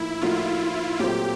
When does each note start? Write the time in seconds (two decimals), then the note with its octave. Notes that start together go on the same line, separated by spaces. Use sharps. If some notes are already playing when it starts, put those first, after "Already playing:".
Already playing: A2 F3 A#3 D#4 E4
0.21 A2 F3 A#3 D#4 F4 F#4
1.00 A#2 F#3 A3 C4 F4 G4